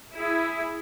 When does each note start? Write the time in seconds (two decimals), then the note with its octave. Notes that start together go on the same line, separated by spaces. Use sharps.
0.16 E4 G#4